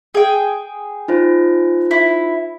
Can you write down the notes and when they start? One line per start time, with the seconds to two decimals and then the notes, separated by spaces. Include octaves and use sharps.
0.15 G#4 G5
1.08 D#4 F4 C5
1.91 E4